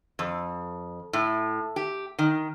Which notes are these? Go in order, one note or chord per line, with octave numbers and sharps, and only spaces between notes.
F2
A2
G4
D#3